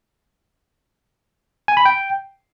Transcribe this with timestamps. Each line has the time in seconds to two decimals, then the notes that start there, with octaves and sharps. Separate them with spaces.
1.68 G#5
1.77 B5
1.85 G5